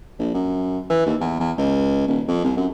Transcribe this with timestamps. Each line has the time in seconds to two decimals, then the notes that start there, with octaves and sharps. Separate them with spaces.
0.19 A#1
0.34 F#2
0.90 E3
1.06 D#2
1.20 E2
1.40 E2
1.58 C#2
2.07 D#1
2.28 F2
2.44 C2
2.57 F#2